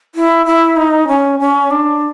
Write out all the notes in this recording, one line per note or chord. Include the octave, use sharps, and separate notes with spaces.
E4
E4
D#4
C#4
C#4
D4